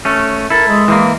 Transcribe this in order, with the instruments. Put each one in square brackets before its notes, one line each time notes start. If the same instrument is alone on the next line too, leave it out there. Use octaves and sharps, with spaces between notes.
[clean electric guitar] A3 C#4
[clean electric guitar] E4 A4 [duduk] A#4
[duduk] G#3
[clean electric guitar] E3 G3 A#3